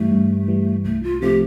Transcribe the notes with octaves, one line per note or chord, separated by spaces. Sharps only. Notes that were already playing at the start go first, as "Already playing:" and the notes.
Already playing: G2 E3 G3 A3
G2
E3 G3
C2 A3
F4
C3 F3 A3 G4